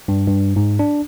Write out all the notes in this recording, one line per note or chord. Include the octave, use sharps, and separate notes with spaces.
G2
G2
G#2
D4